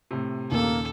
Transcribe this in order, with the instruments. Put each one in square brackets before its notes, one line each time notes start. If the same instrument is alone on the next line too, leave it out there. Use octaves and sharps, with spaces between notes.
[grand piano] A2 C3
[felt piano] D#2 A#2 C#3 [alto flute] A#3 [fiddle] A4